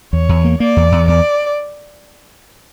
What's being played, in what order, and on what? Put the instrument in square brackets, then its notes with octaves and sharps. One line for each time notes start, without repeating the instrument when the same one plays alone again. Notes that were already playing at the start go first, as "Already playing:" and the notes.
[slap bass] E2 [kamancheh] C#5
[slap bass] E2
A#3
[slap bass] A#3 [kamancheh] D5
[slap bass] E2
E2
[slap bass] E2 [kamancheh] D5